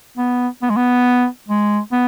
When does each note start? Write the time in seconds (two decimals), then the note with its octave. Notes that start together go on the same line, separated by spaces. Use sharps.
0.18 B3
0.62 B3
0.70 G#3
0.77 B3
1.49 G#3
1.92 B3